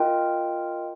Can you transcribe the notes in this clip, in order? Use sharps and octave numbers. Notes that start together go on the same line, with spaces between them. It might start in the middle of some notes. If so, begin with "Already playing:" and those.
Already playing: F4 A#4 D#5 G5